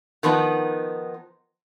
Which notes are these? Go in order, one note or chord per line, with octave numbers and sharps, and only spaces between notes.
D#3 F3 B3 D#4